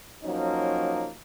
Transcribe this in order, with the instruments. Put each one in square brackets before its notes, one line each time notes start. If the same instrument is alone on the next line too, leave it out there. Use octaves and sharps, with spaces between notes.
[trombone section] F3 F#3 A#3 C#4 D#4